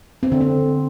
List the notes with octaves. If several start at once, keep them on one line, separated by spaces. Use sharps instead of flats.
C4
D3
C4